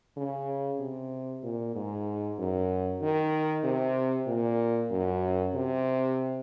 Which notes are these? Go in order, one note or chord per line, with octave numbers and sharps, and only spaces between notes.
C#3
C3
A#2
G#2
F#2
D#3
C3
A#2
F#2
C3